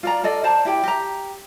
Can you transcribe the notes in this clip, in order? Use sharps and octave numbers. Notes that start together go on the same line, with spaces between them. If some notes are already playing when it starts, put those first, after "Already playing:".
F4 D5 A#5
F4 A4 D5 D#5
C5 D5 A5 A#5
E4 G4 G5
G4 A#5